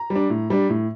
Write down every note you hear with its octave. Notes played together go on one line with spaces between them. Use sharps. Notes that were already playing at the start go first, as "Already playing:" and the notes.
Already playing: A#5
G3
D4
A2
G3 D4
A2